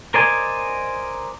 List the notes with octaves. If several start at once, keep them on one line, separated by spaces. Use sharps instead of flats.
A#4 C5 D5 D#5 G#5